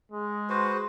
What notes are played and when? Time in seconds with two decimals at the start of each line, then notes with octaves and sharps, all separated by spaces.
0.12 G#3
0.50 F#4 B4 C5